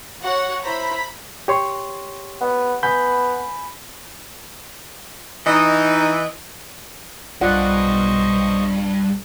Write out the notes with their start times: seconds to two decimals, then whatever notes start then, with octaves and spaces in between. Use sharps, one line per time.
0.22 F#4 C#5 F#5
0.64 E4 C5 A#5 B5 B6
1.48 G4 C#5 C6
2.41 B3
2.83 B3 G#5 B5 G6
5.47 E3 D#4 D#5
7.41 B1 G2 F4 C5 D5 D#5 F#5 C#6